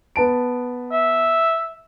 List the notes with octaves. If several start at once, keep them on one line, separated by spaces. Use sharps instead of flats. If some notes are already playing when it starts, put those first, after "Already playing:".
B3 A5 D7
E5